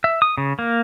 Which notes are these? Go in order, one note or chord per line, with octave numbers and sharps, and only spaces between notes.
E5
D#6
C#3
A#3